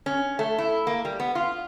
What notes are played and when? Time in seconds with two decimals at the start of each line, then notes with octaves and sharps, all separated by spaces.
0.06 C#4
0.39 A3
0.58 E4
0.87 A#3
1.05 G3
1.20 B3
1.35 F4